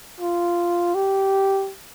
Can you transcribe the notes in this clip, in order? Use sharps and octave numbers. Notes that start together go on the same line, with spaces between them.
F4
G4